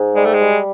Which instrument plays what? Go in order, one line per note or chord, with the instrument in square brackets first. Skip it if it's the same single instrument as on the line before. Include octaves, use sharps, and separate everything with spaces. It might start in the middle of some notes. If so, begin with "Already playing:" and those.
Already playing: [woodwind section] G#2
[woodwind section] G3 [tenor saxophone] G#3
[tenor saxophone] A3
G#3
[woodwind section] G3